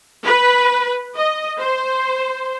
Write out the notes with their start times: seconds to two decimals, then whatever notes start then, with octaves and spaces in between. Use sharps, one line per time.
0.25 B4
1.15 D#5
1.59 C5